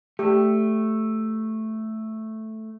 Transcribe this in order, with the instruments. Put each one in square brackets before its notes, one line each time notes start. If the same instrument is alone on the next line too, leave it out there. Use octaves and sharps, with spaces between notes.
[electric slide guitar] A3 [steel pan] G4